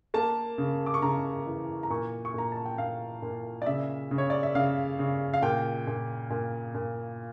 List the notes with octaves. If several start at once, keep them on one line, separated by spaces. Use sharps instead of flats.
A#3 A5
C#3
D6
C#6
C#3 A#5
E3
A#5
A#2 C#6
C#6
A#2 A#5
A5
G5
A#2 F5
A#2
D5
C#3 E5
C#3
C#5
D5
E5
C#3 F5
C#3
F5
A#2 G5
A#2
A#2
A#2